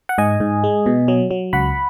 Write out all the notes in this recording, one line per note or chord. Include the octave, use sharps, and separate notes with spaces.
F#5
G#2 D#5 G#5
G#2
G#3
B2
F#3
F#3
C#2 F#5 B5